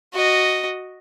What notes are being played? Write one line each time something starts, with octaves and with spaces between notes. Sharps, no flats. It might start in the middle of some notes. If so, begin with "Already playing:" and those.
F#4 D#5